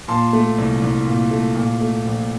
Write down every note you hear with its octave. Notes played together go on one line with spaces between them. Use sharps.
A#2 A5 C6
A3
C2
C2
A#2
A3
A#2
A3
A#1